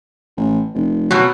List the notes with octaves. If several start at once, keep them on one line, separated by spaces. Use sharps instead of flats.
A1
F1
B2 F#3